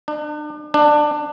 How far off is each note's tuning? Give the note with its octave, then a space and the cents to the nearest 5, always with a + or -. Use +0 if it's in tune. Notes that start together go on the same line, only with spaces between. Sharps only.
D4 +40
D4 +20